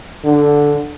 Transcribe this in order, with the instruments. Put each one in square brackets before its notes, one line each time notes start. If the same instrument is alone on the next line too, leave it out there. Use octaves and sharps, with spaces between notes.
[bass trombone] D3